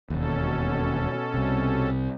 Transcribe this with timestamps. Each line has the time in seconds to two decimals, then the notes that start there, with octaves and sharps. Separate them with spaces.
0.10 E1 D#2 B2 C#4 A4
1.34 C2 C3